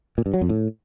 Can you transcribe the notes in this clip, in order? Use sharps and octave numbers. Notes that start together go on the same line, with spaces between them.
A#2
G2
F#3
F2
A2